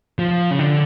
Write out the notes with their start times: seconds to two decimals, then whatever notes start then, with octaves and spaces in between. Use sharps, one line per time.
0.19 F3
0.51 C#3
0.59 D3